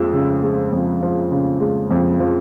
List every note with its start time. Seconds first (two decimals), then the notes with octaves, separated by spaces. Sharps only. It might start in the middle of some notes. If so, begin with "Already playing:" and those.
Already playing: F2 F3 G#3 E6
0.13 C#3
0.43 G#3
0.72 F2
1.03 F3
1.32 C#3
1.60 G#3
1.91 F2
2.20 F3